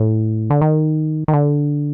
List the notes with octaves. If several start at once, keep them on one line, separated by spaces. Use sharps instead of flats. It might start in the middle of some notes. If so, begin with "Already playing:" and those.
Already playing: A2
D3
D#3
D#3
D3